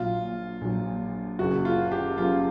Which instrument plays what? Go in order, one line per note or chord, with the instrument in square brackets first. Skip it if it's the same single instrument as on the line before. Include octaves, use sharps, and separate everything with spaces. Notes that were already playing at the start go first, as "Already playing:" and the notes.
Already playing: [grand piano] A#1 A#2 F#3 [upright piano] F4
[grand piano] A#1 A#2 F#3
[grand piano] F#1 F#2 C#3 [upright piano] F#4
[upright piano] F4
G4
[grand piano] F#1 F#2 C#3 [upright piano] F4